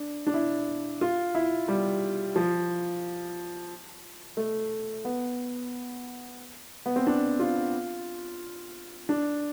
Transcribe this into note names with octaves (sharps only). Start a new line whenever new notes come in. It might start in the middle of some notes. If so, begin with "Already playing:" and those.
Already playing: D4
D4
E4
F4
E4
G3
F3
A3
B3
B3
C4
D4
F4
D4